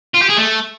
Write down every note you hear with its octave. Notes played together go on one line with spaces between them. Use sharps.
F4
G4
G#4
A3